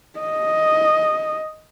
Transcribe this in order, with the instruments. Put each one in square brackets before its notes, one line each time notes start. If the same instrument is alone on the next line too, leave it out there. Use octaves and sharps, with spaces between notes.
[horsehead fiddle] D#5